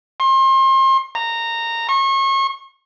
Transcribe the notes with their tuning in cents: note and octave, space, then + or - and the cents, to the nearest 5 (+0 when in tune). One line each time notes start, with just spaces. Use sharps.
C6 +35
A#5 -15
C#6 -35